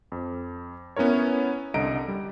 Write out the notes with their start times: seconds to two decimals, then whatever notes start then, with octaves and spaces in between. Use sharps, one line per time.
0.12 F2
0.96 B3 C#4 E4 A#4 C#5
1.74 C2 D3 D#5 A#5 D7
2.08 G3